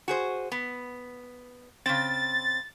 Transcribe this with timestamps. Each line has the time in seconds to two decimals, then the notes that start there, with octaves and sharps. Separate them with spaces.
0.08 F#4 G#4 C5
0.52 B3
1.86 C#3 C4 A6